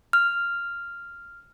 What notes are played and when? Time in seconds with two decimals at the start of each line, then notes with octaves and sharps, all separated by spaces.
0.13 F6